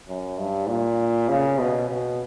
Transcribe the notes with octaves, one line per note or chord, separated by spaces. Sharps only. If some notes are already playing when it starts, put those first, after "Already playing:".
F#2
G2
A#2
C#3
B2
B2